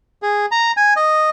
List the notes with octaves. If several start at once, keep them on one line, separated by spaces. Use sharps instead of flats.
G#4
A#5
G#5
D#5